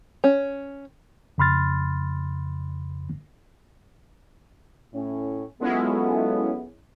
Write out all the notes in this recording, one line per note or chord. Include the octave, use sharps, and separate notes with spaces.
C#4
F2 C#3 B5 C6 F6 A6
A2 C#4
F#3 G#3 B3 C#4 E4 F4 A4